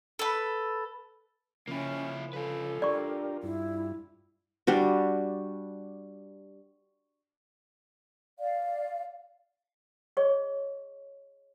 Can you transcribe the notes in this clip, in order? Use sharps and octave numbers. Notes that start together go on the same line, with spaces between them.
A4 B4
C#3 F3 A#3 C#4 E4
F4 A4 B4
D4 G4 A#4 D5 C#6
G2 E4
G3 D4 F#4
D5 F5
G#4 C#5 D#5 C#6